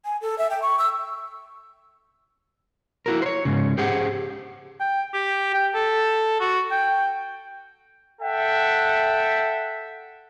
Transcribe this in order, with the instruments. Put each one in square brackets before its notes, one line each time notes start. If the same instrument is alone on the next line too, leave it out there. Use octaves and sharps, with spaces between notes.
[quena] G#5
A4
E5
G5
C#6
E6
[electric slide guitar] E4 F#4 A#4
C5 C#5
G#2 C#3
G4 G#4 C5 F#5
[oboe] G5
G4
G5
A4
F#4
G5
[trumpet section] A4 E5 F#5 G5